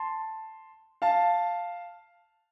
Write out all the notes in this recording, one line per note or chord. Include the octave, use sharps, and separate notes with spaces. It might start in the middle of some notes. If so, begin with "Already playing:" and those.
Already playing: A5 C6
F5 A5